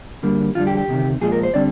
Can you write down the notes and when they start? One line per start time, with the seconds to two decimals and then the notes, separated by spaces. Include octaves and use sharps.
0.23 D2 D3 G3 A#3
0.55 F2 D3 G3 F4
0.67 G4
0.77 G4
0.88 D2 C3 D#3
1.21 A#2 F3 G#3 G#4
1.32 A#4
1.43 C5
1.54 D3 G3 C4 D5